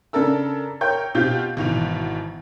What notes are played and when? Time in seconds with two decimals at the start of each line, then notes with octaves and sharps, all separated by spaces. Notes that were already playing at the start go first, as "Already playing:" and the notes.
0.13 C#3 D4 A4 A#4 E6
0.81 A#4 C#5 G5 G6
1.15 B2 C4 F4 G4 G6
1.57 G#1 B2 E3 F7